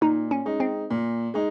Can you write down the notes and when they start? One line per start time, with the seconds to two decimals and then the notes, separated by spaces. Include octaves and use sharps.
0.01 A#2 D#4
0.31 C#4
0.45 G#3 D#4
0.60 C4
0.90 A#2
1.34 G#3 D#4